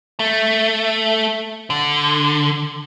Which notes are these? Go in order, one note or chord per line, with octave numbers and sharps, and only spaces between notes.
A3
D3